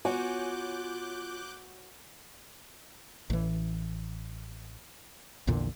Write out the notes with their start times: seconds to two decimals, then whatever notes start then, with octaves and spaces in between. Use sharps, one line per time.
0.05 B3 F4 F#4 C#5 G#5 D6 F#6 G6
3.30 A1 E3
5.47 A#1 E2 A#2 D3